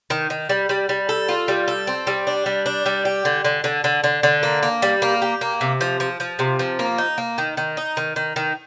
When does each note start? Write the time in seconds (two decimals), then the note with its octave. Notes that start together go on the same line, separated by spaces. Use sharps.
0.10 D#3
0.30 D#3
0.49 G3
0.69 G3
0.89 G3
1.09 A4
1.29 F4
1.48 G3
1.68 A4
1.87 C4
2.07 G3
2.27 D4
2.46 G3
2.66 D4
2.86 G3
3.05 G4
3.25 D3
3.45 D3
3.64 D3
3.84 D3
4.04 D3
4.23 D3
4.43 A#3
4.63 A#3
4.82 G3
5.02 A#3
5.22 G4
5.41 A#3
5.61 C3
5.81 F3
6.00 F3
6.20 F3
6.39 C3
6.59 F3
6.79 A#3
6.98 D#4
7.18 A#3
7.38 D#3
7.57 D#3
7.77 D#4
7.97 D#3
8.16 D#3
8.36 D#3